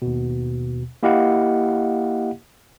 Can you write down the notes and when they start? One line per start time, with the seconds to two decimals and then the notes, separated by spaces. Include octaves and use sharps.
0.02 D#2 B2
1.03 A#3 E4 G4 D#5 F5 F#5